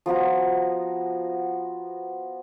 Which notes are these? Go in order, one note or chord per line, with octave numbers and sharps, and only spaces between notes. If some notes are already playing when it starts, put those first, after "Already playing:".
F3 B3 F#4 A#5